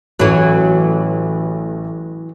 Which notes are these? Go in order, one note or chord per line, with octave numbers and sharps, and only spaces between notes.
A1 E3 F#3 A3